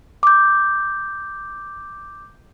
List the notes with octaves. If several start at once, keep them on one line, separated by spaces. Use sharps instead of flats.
D6 G6